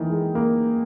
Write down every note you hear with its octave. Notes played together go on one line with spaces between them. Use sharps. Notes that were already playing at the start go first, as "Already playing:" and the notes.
Already playing: D#3 E3
G#3
A#3